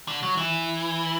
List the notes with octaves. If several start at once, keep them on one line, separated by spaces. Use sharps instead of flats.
D3
F#3
E3